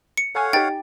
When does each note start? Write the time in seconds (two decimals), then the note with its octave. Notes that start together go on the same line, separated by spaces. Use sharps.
0.17 C#7
0.35 A4 C#5 F5 F#5 G#5
0.53 D#4 G4 G5 A6